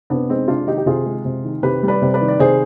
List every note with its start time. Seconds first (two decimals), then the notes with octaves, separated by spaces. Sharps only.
0.10 C3 B3 D4
0.30 G#3 C4 D#4
0.48 C3 D4 F4
0.67 D#3 D#4 G4
0.77 G4
0.86 C3 F4 G#4
1.06 G#3
1.25 C3
1.44 D#3
1.63 C3 G4 B4
1.83 G3
1.88 B4 D5
2.02 C3
2.14 B4 D5
2.21 D#3
2.28 D5
2.39 C3 G#4 C5